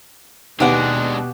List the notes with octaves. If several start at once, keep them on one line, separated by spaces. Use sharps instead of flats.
D#2 B2 G#3 B3 D4 G4 F#5